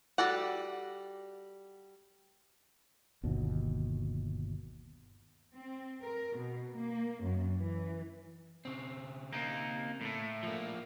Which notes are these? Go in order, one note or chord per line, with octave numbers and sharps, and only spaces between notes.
G3 F#4 A4 D5 F#5
G1 D#2 B2
C4
A#4
B2
A#3
F#2
E3
C#3 C4
A#3 D#4
A2 A3
F3 A#3